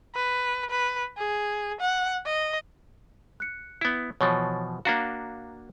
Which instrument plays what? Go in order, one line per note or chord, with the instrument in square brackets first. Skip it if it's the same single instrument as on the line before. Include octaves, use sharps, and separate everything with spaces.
[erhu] B4
B4
G#4
F#5
D#5
[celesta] F#6 C#7
[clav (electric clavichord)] B3 E4
[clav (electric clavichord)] B2 E3 F3 [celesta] C#5 C#6 A6
[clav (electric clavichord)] A#3 D4 F#4 [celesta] F5 A#5